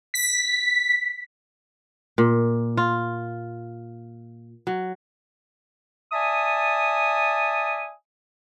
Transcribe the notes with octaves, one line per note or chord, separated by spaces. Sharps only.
B6
A#2
F4
F#3
D5 E5 G#5 A5 D#6